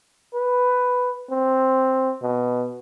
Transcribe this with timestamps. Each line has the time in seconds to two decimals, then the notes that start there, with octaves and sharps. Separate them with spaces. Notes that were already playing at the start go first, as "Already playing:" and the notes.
0.34 B4
1.31 C4
2.22 B2